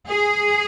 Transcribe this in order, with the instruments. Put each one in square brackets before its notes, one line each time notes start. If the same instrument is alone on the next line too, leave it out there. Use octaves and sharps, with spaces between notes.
[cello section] G#4